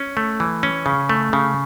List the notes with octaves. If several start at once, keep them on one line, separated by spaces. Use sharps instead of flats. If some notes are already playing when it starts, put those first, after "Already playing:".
Already playing: C#4
A3
E3
C#4
C#3
A3
C#3